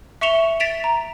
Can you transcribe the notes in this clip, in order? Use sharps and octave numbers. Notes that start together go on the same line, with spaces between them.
E5 C#6 C#7 E7 F7 G7
A6 B6 D7 E7 F7
A#5